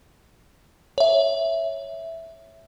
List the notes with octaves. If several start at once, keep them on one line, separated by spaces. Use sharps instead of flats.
C#5 E5